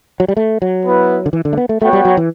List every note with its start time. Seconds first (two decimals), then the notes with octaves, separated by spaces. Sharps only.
0.20 F#3
0.28 G3
0.37 A3
0.62 F#3
0.85 B3 E4 B4
1.26 D3
1.33 E3
1.45 D3
1.53 A3
1.57 B3
1.69 A3
1.82 A3 B3 F#4 C#5 G5
1.93 G3
2.05 F#3
2.17 E3